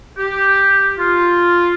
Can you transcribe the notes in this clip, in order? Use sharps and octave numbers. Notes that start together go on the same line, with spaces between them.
G4
F4